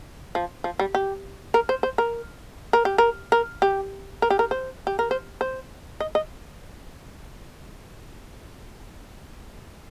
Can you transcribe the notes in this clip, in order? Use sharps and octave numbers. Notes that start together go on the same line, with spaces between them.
F3
F3
G3
G4
A#4
C5
C5
A#4
A#4
G4
A#4
A#4
G4
A#4
G4
A#4
C5
G4
A#4
C5
C5
D#5
D#5